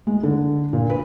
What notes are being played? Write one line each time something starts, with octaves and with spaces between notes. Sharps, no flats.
G#3
D3
A#2
B4